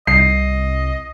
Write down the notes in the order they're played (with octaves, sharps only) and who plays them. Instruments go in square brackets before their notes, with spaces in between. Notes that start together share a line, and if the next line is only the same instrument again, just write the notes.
[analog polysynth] C2 [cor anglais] D#5 [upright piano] C7